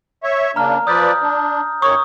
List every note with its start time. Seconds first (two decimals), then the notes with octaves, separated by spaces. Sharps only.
0.23 C#5 E5
0.56 C#3 A#3 D4 A#5 F6
0.87 F3 B4 D5 D#6 G6
1.21 D4
1.82 F#2 D#3 C#5 C#6 D#6